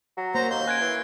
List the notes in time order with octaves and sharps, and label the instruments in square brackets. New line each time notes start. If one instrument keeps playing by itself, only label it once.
[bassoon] F#3
[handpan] A#3 C#5 [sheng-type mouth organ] C5 A#5
[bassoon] D#2 [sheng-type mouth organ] C6 G6
[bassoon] C#4 [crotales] F#6 G#6 D7
[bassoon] E3